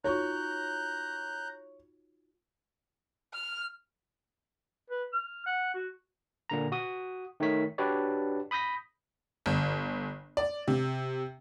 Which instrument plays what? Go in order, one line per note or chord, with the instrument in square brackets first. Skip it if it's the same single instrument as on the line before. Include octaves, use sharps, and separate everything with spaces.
[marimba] D#4 F4 F#4 [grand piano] C#5 C#6 [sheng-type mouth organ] A#5 F#6 G6
[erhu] F6
[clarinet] B4
F6
F#5
F#4
[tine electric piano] A#2 D3 A#5
F#4 D#6
D#3 A3 D#4 C#5 B6
D4 F#4 G4 B4 C#5 D5
B5 D#6 G6 A#6 B6
[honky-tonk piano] G1
D5
C3